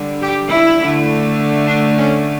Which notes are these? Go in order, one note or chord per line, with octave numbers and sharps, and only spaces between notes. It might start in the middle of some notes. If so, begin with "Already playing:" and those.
Already playing: D3 G3
G4
E4
D3 A3
D4
C#4